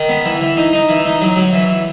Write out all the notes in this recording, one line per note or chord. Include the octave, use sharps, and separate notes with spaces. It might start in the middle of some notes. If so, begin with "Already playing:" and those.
Already playing: D#3
B3
E3
E3
D#4
D#4
E3
D#4
F#3
F#3
E3